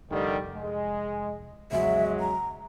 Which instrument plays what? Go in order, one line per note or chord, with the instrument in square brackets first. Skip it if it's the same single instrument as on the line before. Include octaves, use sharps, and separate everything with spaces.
[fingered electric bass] F1 [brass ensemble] D3 D#3 G3
[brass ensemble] G#3
[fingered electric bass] A#1 E2 C#3 [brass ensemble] F#3 G#3 [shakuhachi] E5
[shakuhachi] A#5